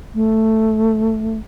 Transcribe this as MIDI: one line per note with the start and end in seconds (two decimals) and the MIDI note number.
0.14 1.38 57